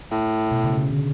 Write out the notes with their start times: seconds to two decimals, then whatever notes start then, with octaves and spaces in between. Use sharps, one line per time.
0.11 A2
0.51 B2
0.64 C#3
0.78 C#3
0.90 D3